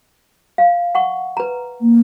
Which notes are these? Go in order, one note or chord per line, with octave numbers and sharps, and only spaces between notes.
F5
F#5 C#6
B4 A#5
A#3